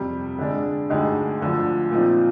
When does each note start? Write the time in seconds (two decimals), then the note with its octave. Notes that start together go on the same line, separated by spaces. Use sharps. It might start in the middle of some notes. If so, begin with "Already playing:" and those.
Already playing: F2 C3 G3
0.39 D3 G#3 D4
0.90 D2 D3 G#3 D#4 G4
1.41 D2 D3 F3
1.91 A#2 F3 C4 D#4